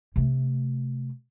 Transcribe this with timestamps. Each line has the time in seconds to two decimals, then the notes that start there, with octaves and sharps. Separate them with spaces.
0.16 C3 A3